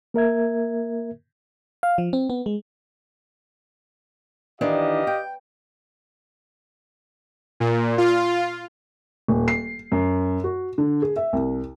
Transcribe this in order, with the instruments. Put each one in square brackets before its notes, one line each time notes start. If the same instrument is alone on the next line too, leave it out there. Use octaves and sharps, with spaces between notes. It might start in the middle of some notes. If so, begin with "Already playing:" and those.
[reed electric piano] A#3 A#4 E5 G#6
[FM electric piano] F5
F3
C4
B3
G#3
[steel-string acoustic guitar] D#3 E3 D4 [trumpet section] G4 D#5 F5
[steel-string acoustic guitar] G5
[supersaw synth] A#2
F4
[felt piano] D#1
C7
F#2
F#4
D3
G#4
E5
C2